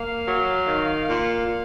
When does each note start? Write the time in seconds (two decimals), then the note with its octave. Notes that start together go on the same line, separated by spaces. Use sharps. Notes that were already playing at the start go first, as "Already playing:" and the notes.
Already playing: A#3 F5
0.26 F#3
0.66 D#3
1.05 A#2 F5
1.46 A#2